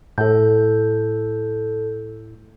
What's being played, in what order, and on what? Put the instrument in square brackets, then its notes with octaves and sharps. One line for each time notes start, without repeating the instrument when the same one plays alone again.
[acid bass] A2 [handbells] A4 G6